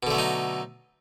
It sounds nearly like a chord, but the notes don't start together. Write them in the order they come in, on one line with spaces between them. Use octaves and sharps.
B2 D3 A3 F#3 D#4